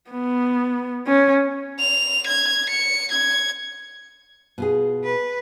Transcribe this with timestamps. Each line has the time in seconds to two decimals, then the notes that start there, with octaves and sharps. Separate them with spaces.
0.11 B3
1.07 C#4
1.80 F7
2.26 G#6
2.69 C#7
3.11 G#6
4.58 B2 F4 G#4
5.04 B4